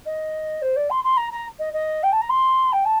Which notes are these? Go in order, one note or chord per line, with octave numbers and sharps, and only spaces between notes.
D#5
C5
D5
C6
C6
A#5
A#5
D#5
D#5
G5
A5
A#5
C6
G5
A5